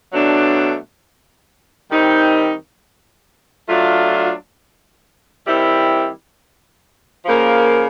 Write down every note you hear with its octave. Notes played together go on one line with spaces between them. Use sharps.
B2 F#3 A3 D4
D#3 G3 C4 D#4
F#3 A3 D4 F4
D#3 G3 C4 E4
C#3 F3 A#3